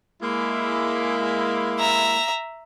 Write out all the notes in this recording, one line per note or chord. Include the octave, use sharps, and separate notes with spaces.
G#3 A#3 E4
E5 A#5